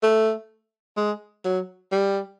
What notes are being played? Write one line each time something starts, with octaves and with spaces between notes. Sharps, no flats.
A3
G#3
F#3
G3